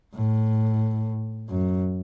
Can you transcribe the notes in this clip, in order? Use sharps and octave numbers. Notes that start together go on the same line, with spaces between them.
A2
F#2